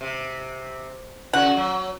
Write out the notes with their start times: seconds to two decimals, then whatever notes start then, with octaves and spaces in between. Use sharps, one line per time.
0.01 C3
1.33 C#3 F#4 F#5
1.57 F#3